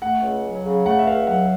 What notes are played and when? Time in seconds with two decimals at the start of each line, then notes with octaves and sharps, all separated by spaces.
0.01 A3 F#5
0.22 C#2
0.44 F#3
0.65 C#3
0.86 A3 F#5
0.99 E5
1.06 C#2 F5
1.27 F#3 F#5